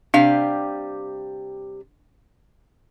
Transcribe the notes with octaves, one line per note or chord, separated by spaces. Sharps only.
C3 G3 D4 F5